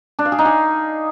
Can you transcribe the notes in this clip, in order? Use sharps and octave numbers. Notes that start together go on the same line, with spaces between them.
D4
F5
G#4
D#4
G#4